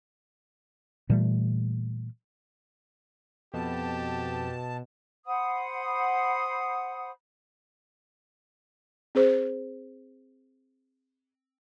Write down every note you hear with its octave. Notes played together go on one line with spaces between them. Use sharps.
A#2 E3 G3 A3
F2 B2 G4 A5
C5 F#5 B5 D#6
C4 G#4 C5